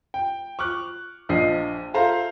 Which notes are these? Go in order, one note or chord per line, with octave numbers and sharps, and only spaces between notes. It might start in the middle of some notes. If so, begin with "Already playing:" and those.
G5
C#6 D6 F6 F#6
A#1 F3 D4 D#5 C7
F4 A4 C5 E5 F5 A#5